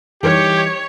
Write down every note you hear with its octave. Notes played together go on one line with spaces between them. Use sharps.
E3 G3 D#4 G4 C#5